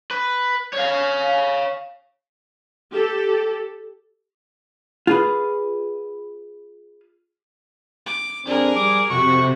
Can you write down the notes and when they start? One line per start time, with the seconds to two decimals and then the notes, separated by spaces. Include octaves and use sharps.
0.11 B4
0.73 C#5 F5
2.90 G4 A4
5.07 F4 G#4 B4
8.06 D6
8.46 F2 C4 D4 G#4 A#4
8.76 F3 G3 D6
9.10 F2 C3 F#4 C#6